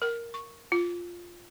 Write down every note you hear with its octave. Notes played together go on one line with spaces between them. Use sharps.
A#4
C#6
F4